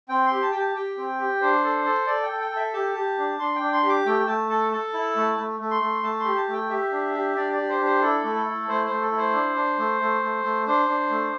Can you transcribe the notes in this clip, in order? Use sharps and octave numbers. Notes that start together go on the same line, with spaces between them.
C4 G5
C6
G4
A5
G4 G5
A5
G4 G5
C4
G4
D4 C5
A4
A4
A4 D5
G5
A4
G5
A4
E5
G4 A5
G4
D4
D4 C6
G5
D4
C6
G4
D6
A3 G5
A3 A5
A4 A5
A4 A5
E4
A3
A3
A3
C6
A3
A3 A5
C6
G4
A5
A3
G5
G4 E5
D4
G4
D4 D5
G4 D5
C5
D4
C5
E4 A4
A3
A4
E4
A3 C5
A3 C5
A4
E4
C5
D4
D4
A3
A3
A3
A3
D4 C5
D4
A3